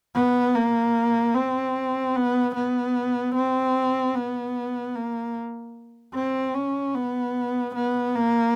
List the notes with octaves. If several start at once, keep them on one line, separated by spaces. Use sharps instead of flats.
B3
A#3
C4
B3
B3
C4
B3
A#3
C4
C#4
B3
B3
A#3